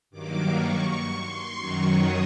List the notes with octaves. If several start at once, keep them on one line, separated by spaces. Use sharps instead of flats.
G2 D#3 F#3 A#3 D6
C#6
C6
F#2 D#3 F#3 C#6
D#6